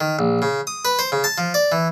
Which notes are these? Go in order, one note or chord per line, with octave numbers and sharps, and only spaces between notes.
D#3
A#1
C#3
D#6
B4
C5
C#3
A5
F3
D5
E3